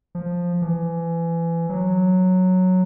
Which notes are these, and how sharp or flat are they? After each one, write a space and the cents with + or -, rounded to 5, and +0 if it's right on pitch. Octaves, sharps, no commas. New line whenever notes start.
F3 +5
E3 +25
F#3 -5